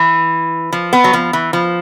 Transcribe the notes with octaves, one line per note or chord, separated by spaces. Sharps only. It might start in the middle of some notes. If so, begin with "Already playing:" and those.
Already playing: E3
F3
B3
F#3
F3
E3
F3